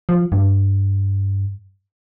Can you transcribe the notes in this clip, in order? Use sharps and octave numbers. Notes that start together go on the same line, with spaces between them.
F3
G2